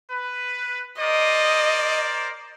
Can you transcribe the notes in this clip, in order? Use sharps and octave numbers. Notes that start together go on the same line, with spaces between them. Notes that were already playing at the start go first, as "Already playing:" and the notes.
B4
A#4 C5 D5 D#5